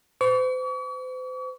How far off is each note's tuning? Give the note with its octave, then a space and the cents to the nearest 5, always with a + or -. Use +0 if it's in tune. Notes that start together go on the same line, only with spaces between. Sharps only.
C5 -40 C#6 +45